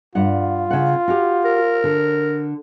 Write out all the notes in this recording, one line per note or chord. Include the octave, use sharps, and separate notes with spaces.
G2 F4 F#5
C#3 F#5
F#4 G4
A#4
D3